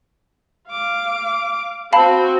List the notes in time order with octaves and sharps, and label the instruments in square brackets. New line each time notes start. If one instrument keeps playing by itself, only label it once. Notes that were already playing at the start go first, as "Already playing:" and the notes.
[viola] F5 D6
[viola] C4 F#4 [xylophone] F5 A5 B5